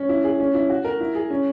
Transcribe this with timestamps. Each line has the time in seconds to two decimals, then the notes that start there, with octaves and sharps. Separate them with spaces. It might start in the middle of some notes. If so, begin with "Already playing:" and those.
Already playing: C#4
0.09 E4
0.24 G#4
0.40 C#4
0.55 E4
0.70 F#4
0.85 A#4
1.00 E4
1.15 G#4
1.30 C#4